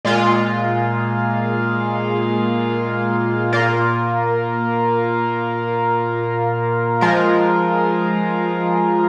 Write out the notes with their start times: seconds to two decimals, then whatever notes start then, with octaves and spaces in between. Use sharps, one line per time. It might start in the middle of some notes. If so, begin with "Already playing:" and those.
0.05 A#2 G#3 F4
3.53 A#2 A#3 F4 A#4
7.01 F3 G#3 F4 A#4